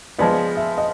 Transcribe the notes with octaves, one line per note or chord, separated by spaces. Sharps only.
F3 G#3 B3 D5
E5
D#5